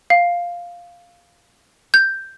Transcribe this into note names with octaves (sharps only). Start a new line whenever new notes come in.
F5
G6